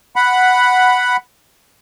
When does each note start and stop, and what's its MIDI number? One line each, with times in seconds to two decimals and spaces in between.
0.16 1.17 78
0.16 1.17 83